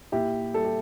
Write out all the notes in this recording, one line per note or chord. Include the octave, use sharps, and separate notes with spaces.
A#2 E4 G4
G3 A4
G4